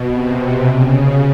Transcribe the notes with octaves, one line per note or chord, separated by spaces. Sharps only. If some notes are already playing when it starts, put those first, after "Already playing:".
Already playing: B2
C3
B2
C#3